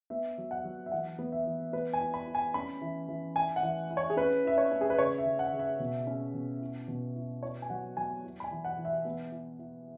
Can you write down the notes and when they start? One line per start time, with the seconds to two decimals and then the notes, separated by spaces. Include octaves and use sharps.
0.10 B3 E5
0.38 F#3
0.51 F#5
0.64 F#3
0.86 E5
0.92 E3 F#5
1.19 B3
1.32 E5
1.46 E3
1.73 B3 B4
1.93 G#5
2.01 E4
2.14 B5
2.27 E4
2.35 G#5
2.54 C#4 B5
2.81 E3
3.09 E3
3.35 E4 G#5
3.56 F#5
3.63 E3
3.90 E4
3.97 C#5
4.10 G#4
4.17 C#4 B4
4.44 E4 E5
4.58 C#5
4.71 C#4
4.81 G#4
4.90 B4
4.98 C#3 C#5
5.18 E5
5.26 C#3
5.39 F#5
5.53 C#3
5.59 E5
5.79 B2
6.07 C#4
6.34 B2
6.61 E4
6.88 B2
7.16 E4
7.42 E4 C#5
7.62 G#5
7.70 F#3 F#5
7.97 F#3 G#5
8.24 E4
8.40 B5
8.44 G#5
8.51 E3
8.64 F#5
8.78 E3
8.85 E5
9.05 B3
9.32 E4
9.59 E4